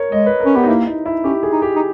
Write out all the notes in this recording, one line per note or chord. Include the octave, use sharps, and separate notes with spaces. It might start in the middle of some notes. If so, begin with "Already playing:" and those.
Already playing: A#4 C#5
G#3 D#5
B4
A#4
C#4
B3 G4
D#4
A#3 E4
D#4
E4
C#4 G4
G#4
D#4
G4
D#4